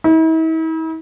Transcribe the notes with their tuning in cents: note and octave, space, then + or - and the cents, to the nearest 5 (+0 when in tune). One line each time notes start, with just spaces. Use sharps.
E4 -45